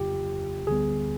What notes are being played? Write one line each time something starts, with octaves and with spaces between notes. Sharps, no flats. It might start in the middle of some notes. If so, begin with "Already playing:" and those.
Already playing: F2 C#3 F#3 A#3 F4 G4
D2 D3 G3 B3 G#4